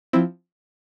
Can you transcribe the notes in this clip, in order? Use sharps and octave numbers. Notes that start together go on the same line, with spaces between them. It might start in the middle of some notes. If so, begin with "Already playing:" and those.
F3 C4 E4